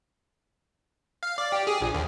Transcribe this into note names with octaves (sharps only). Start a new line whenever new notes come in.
F5
D5
G4
G#4
A#1
D#2